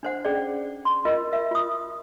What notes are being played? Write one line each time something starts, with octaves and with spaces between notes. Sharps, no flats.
D4 C5 F#5
C#4 G#4 D5
C6
F4 A#4 D#5
A#4 E5
F4 D#6